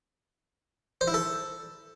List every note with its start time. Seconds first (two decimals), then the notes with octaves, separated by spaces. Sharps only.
1.01 C5
1.08 E4
1.14 A4